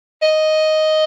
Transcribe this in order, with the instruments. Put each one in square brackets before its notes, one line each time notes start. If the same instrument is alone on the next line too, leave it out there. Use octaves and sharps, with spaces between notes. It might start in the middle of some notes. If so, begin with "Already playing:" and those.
[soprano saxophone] D#5